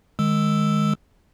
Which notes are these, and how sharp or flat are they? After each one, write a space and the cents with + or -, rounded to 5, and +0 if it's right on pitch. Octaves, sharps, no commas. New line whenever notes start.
D#3 -10 G#3 +5 E6 +0